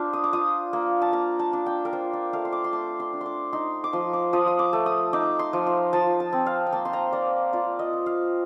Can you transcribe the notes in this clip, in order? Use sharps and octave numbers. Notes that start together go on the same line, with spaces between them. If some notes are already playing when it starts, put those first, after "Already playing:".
Already playing: D4 F4 C5 F5
D#6
D6
F4 D#6
A#3
A5
A#3 A#5
A5
D4
G5
A#4
F4 C5
D5
A3 F5
C6
D6
C6
A3 D6
C6
D4
C6 D6
D#4 C6
D6
F3 C6
D6
F3 D#6
D#6
D6
A3
D#6
D#4 D6
C6
F3
A#5
F3 A5
A5
C4
F5
G5
A#3 A5
C6
A#5
A#3 D5
F4 D5
D#5
F4
F5